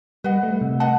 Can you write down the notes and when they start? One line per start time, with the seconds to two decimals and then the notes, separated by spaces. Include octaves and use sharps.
0.24 G3 B4 D#5 F#5
0.43 A3
0.61 C3
0.80 B4 D#5 F#5 A5